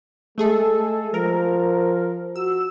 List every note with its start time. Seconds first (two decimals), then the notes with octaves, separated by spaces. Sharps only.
0.38 G#3 A3 G#4 A4
1.14 F3 A#4
2.36 F#4 E6